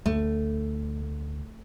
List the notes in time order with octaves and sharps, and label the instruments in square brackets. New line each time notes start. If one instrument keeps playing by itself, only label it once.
[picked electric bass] D2 [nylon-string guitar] A3